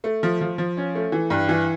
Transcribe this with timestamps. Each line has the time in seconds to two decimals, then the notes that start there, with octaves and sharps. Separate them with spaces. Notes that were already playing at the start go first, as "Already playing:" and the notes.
0.04 A3
0.23 F3
0.41 F3
0.58 F3
0.77 C#4
0.95 A3
1.12 E3
1.30 G2
1.49 E3